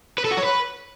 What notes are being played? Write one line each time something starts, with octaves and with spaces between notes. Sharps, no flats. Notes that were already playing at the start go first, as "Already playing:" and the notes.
B4
A4
F#4
C#5
B4